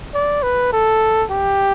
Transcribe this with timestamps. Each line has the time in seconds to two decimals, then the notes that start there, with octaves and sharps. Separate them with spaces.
0.14 D5
0.43 B4
0.73 A4
1.30 G4